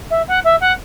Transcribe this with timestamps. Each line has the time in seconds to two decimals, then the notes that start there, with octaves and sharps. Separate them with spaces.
0.10 E5
0.28 F#5
0.44 E5
0.61 F#5